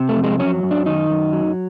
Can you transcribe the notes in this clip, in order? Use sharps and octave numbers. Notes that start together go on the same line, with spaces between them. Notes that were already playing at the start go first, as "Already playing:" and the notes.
Already playing: C3
A3
F2
G#3
F#3 C#4
F#2
D4
D#3 D#4
F#2
F#3